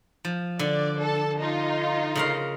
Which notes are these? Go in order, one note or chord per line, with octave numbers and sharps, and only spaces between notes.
F3
D3 D5
A4 A5
D#4 F4
C#3 A#4 F5